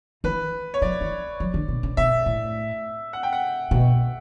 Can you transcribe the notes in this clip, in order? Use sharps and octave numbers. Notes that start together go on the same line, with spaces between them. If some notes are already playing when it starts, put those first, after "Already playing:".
E3 B4
C#5
F#3 D5
E3
F#3
D3
B2
C#3
B2 E5
A2
F#5
G5
F#5
B2